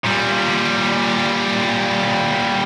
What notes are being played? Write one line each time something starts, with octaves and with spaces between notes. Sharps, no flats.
A#2 G3